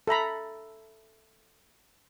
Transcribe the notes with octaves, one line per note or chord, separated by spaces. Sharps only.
A4 E5 A#5 B5